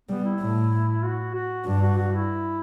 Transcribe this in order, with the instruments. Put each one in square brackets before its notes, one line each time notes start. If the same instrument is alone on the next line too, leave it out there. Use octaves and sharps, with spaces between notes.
[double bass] G3 [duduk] B3
[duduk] E4
[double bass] A2
[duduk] F#4
F#4
[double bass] G2 [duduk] D4
[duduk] F#4
F#4
E4